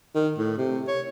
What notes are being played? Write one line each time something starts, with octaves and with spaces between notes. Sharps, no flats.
D#3
A2
C3
C#5